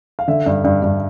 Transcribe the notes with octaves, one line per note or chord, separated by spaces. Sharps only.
F5
D3 E5
G2
G2
G2